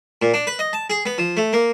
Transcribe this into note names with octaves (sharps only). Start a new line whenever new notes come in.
A#2
D4
B4
D#5
A5
G#4
B3
F3
A3
A#3